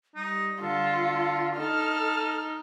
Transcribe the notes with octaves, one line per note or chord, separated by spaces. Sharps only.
G3 D#4
D3 F4 A4
D#4 A4 A5 F6